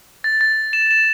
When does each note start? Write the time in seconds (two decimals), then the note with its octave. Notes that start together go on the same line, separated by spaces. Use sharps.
0.24 A6
0.41 A6
0.73 E7
0.91 E7